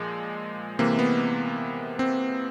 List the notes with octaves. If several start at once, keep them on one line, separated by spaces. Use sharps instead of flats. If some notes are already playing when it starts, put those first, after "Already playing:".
Already playing: A#2 F3 G#3
C3 E3 A#3
B3
C4